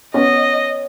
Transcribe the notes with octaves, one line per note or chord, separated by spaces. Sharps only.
B3 C#4 D#5